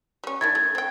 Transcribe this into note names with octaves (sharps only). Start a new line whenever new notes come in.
G3 C#4
D#3 D4 E4 G#6 A6
A3
C4 G5